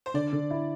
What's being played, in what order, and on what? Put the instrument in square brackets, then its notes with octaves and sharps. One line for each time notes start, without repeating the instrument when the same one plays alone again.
[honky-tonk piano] C5
[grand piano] D3 [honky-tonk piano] D5
[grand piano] D3
E4